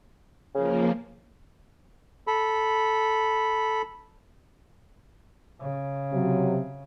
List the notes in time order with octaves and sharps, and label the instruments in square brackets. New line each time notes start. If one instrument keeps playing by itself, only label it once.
[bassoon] C#3 [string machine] F3 A#3
[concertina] A4 B5
[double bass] C#3
[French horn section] C3 F#3